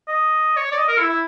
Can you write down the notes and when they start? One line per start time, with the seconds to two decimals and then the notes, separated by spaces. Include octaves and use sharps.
0.08 D#5
0.57 C#5
0.72 D5
0.78 D#5
0.88 A#4
0.99 E4
1.09 E4